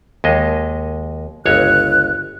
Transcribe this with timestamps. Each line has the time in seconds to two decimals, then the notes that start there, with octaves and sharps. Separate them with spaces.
0.24 D#2 G#3 D#5
1.46 G1 C#2 C#5 F#6